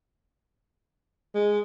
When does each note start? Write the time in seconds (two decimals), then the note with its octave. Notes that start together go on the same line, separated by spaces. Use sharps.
1.34 G#3